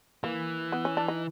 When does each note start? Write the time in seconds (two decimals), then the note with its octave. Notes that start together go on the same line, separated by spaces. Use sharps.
0.24 E3 A#3
0.72 B3
0.85 C#4
0.97 D4
1.08 D#4